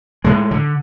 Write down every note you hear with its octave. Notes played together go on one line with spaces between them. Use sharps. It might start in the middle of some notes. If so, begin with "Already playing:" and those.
A2 G#3
D3